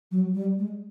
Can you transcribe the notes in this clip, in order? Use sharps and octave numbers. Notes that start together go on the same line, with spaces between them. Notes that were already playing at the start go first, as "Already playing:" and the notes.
F#3
G3
G#3